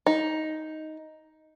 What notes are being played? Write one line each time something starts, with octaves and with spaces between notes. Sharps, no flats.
D#4